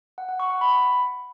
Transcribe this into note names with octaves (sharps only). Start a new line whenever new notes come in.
F#5
F#5
C#6
F#5
B5